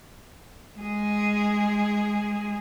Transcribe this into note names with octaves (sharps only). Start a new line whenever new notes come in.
G#3 G#4